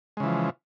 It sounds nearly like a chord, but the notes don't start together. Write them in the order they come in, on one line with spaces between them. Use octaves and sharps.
G#3 C#3 E3 F3